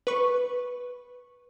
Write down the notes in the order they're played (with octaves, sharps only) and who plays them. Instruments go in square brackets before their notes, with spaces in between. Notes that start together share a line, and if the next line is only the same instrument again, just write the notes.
[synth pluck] B4 C#6